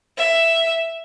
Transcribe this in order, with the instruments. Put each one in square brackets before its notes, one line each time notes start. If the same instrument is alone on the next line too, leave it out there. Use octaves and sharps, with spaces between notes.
[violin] E5